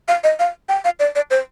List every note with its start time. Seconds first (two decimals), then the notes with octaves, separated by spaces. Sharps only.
0.08 F5
0.24 D#5
0.39 F5
0.69 G5
0.85 F5
1.00 D5
1.16 D5
1.31 C5